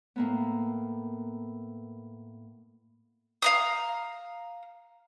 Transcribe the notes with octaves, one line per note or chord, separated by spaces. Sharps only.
A2 A#3 B3
F5 A#5 D#6